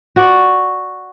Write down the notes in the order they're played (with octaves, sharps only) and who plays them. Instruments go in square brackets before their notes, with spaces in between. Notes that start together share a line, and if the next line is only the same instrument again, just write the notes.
[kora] F#4 D5